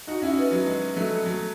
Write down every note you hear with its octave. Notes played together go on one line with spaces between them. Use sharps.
D#4 F#4
C#4 E4
B3 D#4
F#3
G#3
F#3 A3
F#3 A3